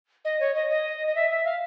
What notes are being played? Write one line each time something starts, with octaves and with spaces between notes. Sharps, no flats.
D#5
C#5
D#5
D#5
D#5
E5
E5
F5